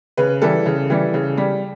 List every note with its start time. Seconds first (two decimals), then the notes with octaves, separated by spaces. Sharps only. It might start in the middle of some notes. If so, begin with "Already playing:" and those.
0.17 C#3 B4
0.42 E3 G3 A4
0.66 C#3
0.90 E3 G3
1.14 C#3
1.37 G3